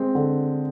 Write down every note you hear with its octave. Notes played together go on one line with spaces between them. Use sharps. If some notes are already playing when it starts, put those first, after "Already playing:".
Already playing: G#3 C4
D3